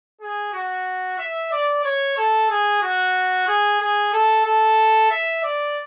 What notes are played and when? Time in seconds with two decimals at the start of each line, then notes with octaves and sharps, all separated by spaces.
0.21 G#4
0.53 F#4
1.18 E5
1.52 D5
1.84 C#5
2.17 A4
2.50 G#4
2.82 F#4
3.47 G#4
3.81 G#4
4.13 A4
4.45 A4
5.11 E5
5.43 D5